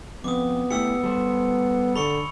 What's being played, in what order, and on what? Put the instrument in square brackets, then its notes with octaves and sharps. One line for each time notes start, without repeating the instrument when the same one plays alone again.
[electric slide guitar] F2 [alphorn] B3 [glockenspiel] D6 D#6
[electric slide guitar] A3 E4 G4 [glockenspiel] E6 C#7
[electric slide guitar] G3 A4 C5
[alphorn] D3 [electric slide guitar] A4 [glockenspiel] B5 C#6 C#7